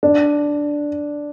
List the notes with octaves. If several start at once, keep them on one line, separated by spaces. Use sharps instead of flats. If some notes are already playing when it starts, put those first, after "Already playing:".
D4